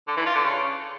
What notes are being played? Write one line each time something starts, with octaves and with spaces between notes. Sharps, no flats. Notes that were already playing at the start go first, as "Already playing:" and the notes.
D3
E3
F4
D3
C#3